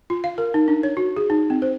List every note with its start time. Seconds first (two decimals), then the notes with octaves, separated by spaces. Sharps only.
0.10 F4
0.24 F5
0.38 A#4
0.54 D#4
0.68 D4
0.83 C#5
0.97 F#4
1.17 G#4
1.30 D#4
1.50 C4
1.62 C5